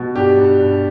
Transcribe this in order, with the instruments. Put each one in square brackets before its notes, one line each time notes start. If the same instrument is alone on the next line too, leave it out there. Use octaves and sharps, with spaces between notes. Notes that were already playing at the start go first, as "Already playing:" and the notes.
Already playing: [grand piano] B2
G2 G4
G2
G2